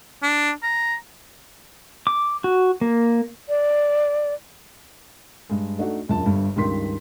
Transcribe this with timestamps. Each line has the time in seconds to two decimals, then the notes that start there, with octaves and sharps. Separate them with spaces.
0.22 D4
0.63 A#5
2.07 D6
2.44 F#4
2.81 A#3
3.49 D5
5.49 G2 G#3
5.78 A3 D4 D#4 F#4 A4
6.09 E1 F#2 F4 A5
6.26 G1 G2
6.56 C#2 G2 D#3 C6 B6